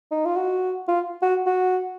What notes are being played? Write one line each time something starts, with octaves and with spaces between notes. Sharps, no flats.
D#4
F4
F#4
F4
F#4
F#4